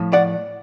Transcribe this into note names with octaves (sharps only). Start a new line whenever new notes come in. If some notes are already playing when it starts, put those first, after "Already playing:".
Already playing: A2 F3
D5 F#5